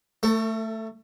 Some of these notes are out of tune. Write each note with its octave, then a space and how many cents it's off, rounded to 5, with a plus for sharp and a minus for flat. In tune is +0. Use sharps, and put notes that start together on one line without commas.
A3 +10 A4 +45